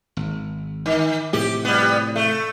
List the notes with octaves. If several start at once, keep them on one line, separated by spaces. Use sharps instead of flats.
G#1
D#3
A2 C3 F3 G4
G3 B3
A3